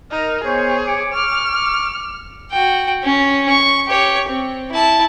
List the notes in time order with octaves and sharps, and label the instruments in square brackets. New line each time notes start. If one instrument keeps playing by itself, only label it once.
[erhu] D#4 [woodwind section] A#4 F6
[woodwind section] B3 C5 C#5 [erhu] G#4
[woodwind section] C#5 D6
[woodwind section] C#6 D6 [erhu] F6
[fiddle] F#4 G5
C#4
C#6
G4 C#5
C4
E4 A5